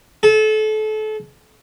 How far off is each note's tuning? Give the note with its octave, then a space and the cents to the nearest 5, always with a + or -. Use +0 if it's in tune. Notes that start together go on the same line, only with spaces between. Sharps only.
A4 -30